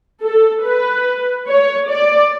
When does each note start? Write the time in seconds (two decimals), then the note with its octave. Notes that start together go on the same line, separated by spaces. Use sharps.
0.24 A4
0.65 B4
1.48 C#5
1.90 D5